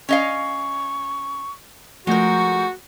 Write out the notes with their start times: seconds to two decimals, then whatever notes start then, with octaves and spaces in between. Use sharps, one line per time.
0.09 C#4 D#5 F5 C#6
2.07 F3 G#3 A3 F#4 A#4 C#6 G6